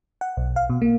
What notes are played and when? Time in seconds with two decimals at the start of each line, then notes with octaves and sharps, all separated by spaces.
0.21 F#5
0.37 B1
0.56 F5
0.70 B2
0.82 A#3